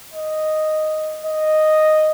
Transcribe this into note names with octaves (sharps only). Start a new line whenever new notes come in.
D#5
D#5